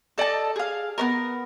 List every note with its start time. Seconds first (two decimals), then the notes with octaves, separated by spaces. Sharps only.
0.18 A4 D5 D#5 A5
0.56 G#4 F5
0.98 B3 C#4 A#4